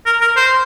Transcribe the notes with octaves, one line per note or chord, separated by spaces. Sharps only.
A#4
A#4
C5